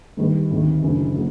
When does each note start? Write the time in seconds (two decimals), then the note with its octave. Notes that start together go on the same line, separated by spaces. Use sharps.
0.17 G2 D#3 G3
0.50 D2 C3 D#3
0.83 F#1 F#2 D3
1.15 F#3 A#3